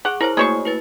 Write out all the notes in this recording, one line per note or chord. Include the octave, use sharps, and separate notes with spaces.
G#4 F#5 D6
E4 A#4 C5 C#5
A3 A#3 F#4 G#4 C#5 C#6
E4 B4 A6